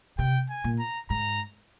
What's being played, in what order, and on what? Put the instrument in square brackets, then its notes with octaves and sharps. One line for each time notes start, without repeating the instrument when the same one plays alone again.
[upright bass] C3 [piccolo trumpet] G5
[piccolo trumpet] G#5
[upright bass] A#2
[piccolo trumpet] A#5
[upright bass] G#2 [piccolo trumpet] A#5